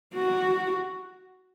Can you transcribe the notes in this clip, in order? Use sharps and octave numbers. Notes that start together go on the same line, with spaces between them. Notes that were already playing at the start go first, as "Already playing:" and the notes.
F#4